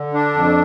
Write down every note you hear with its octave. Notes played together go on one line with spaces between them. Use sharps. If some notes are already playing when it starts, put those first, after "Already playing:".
Already playing: D3
D4
F2